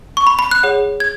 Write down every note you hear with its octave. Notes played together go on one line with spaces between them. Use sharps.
C#6
B5
B5
F#6
G#4 C#5 F#5
G#6